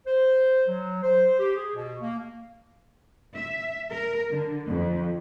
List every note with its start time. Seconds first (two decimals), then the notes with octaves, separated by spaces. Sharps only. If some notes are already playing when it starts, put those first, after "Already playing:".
0.07 C5
0.68 F#3
1.03 C5
1.39 G4
1.56 G#4
1.75 B2
2.02 A#3
3.35 E5
3.91 A#4
4.31 D3
4.68 F2